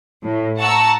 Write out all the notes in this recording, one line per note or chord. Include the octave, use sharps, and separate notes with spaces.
A2
F#5 A5 A#5 C#6 E6